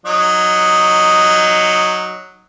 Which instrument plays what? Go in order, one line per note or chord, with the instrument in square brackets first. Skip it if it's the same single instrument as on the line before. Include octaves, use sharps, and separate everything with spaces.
[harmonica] F#3 D#4